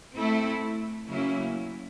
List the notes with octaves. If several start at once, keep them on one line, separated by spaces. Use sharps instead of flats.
A3 C4 E4 A4
C#3 F#3 A#3 C#4 E4